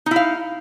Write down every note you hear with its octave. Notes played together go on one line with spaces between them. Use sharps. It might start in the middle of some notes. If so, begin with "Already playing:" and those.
D#4 E4 F5